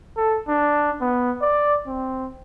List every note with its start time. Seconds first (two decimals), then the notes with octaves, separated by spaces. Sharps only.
0.17 A4
0.48 D4
1.01 B3
1.41 D5
1.87 C4